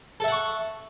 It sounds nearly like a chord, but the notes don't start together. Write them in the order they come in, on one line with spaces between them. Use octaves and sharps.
A4 E5 F#5 C#6